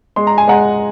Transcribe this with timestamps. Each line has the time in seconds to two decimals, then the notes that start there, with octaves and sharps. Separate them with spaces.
0.16 G#3 C6
0.27 A#5
0.38 G#5
0.48 G#3 F#5 A#5